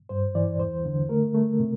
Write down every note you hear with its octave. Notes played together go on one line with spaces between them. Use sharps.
G2 C5
E3 D5
E2 C5
D3
A3 A#4
A3
C3